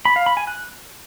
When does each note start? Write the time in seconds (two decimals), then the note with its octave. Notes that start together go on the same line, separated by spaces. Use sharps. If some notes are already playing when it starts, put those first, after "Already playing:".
0.05 B5
0.16 F5
0.26 B5
0.37 G#5
0.47 F#6